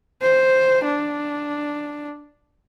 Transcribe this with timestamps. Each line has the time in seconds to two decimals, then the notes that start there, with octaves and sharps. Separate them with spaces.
0.22 C5
0.84 D4